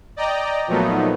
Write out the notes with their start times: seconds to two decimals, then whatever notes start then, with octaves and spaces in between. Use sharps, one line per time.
0.16 D5 D#5 G5 A#5
0.67 A#2 F3 F#3 A3 B3 D#4